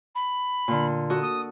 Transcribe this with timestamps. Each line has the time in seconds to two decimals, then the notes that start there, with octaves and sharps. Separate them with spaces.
0.15 B5
0.68 A#2 D3
1.10 F#4 A4 D#5
1.22 D#6